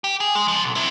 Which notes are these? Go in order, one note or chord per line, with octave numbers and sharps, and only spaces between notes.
G4
G#4
G#3
C#2 F3
B1
C4 E4